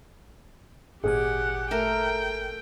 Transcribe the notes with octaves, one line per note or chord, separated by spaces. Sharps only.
G#1 A#2 G4 G#4 F#5 G#5
A3 A#4 G5